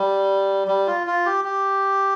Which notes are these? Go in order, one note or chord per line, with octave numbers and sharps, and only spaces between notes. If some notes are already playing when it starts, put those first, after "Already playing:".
Already playing: G3
G3
F4
F4
G4
G4